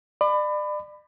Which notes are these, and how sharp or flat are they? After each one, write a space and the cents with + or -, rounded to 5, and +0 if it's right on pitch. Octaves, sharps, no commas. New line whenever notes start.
D5 +35 B5 +20